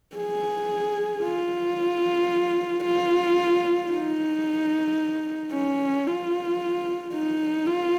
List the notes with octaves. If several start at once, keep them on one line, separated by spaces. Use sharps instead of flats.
G#4
F4
F4
D#4
C#4
F4
D#4
F4